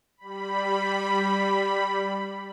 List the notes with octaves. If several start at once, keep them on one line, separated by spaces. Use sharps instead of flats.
G3 B5